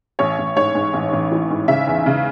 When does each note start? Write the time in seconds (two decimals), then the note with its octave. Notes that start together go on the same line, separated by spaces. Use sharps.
0.19 A1 C#5
0.38 A1
0.56 G#2 C#5
0.75 G#2
0.93 A1
1.12 A1
1.31 E3
1.50 G#2
1.68 C#3 E5
1.87 E2
2.06 C#3